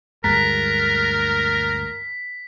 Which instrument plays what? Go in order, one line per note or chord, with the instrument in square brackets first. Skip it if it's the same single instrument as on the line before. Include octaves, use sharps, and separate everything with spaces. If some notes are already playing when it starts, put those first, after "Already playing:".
[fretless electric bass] D2 G2 G#3 [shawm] A#4 [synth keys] A#5 F#6 A6 [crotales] B6